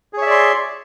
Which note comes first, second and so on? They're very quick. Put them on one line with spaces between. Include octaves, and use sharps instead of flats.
G#4 C#5 E5 D5 C6